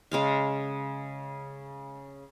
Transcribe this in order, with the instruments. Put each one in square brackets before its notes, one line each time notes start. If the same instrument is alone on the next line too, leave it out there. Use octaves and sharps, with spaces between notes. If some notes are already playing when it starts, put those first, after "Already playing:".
[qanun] C#3 G#3 F5